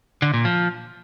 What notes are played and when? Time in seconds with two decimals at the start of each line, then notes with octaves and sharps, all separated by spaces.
0.22 D3
0.34 A#2
0.45 F3